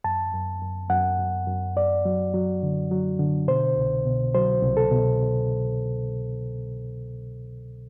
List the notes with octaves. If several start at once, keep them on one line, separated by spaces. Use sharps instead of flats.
F#2 A5
F#2
F#2
F#2 F#5
F#2
F#2
F#2 D5
F#3
F#3
D3
F#3
D3
B2 C5
C2
B2
F#3 C5
C2
A4
B2